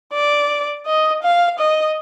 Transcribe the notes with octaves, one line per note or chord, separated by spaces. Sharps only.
D5
D#5
F5
D#5